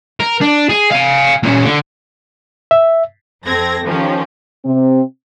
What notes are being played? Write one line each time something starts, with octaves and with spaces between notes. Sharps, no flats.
A#4
D4
G#4
F5 G#5
A#2 C#4
D3
E5
F2 C4 A4 G#6 A#6
D#3 F3 C#4 G4
C3 C4